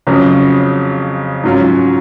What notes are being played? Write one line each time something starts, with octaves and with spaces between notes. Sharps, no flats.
F2 C#3 F#3 C#4
G#2 F#3 C#4 F4